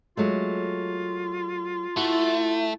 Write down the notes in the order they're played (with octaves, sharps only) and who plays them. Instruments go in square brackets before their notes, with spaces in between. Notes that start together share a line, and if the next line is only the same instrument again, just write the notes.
[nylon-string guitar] F#3 G#3 A3 [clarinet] F4
[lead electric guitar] A3 [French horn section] E4 [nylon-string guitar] F#4